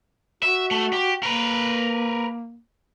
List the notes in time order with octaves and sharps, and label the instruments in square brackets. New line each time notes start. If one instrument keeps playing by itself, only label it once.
[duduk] F#4 [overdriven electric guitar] E5
[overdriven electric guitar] A3
G4
[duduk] A#3 [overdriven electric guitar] A#4 B4